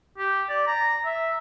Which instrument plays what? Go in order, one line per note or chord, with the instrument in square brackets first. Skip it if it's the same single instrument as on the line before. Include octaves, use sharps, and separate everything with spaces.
[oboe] G4
D5
A#5
E5